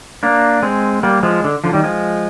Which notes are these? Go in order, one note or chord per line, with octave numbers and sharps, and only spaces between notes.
A#3 D4
G#3 C4
G3 A#3
F3 G#3
D3
D3 F3
D#3 G3
F3 G#3